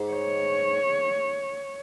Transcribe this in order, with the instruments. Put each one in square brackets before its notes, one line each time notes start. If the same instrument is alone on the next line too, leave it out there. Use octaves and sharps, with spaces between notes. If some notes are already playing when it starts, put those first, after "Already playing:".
Already playing: [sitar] G#2
[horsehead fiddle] C#5